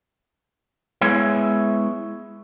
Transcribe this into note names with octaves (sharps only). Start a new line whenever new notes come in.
G#3 B3 E4 G#4 C#5 E5